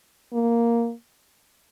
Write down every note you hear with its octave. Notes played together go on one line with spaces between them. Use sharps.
A#3